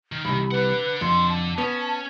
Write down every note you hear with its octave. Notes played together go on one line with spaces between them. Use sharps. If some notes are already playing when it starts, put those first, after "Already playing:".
D#3
C2 F2 B5
D4 B4 F#5
F2 C6
A5
B3 C#4 A5